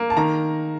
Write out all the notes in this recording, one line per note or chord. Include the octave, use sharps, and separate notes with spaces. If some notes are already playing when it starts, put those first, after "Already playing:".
Already playing: A#3
A5
D#3 A#5